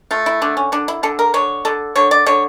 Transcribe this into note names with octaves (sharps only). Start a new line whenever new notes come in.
A3 F4
E4
D3 D4
C#4
D3 D4
E4
D3 A4
A#4
D3 C#5
D3 A4
D3 C#5
D5
D3 C#5